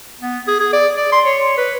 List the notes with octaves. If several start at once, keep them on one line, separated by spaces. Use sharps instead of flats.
B3
G#4
G#4
D5
D5
C6
C#5
B4